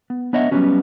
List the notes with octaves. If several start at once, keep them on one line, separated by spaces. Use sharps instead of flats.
B3
B3 D4 C#5 D#5 E5 F#5
F#3 G3 A#3 B3 C#4 F#4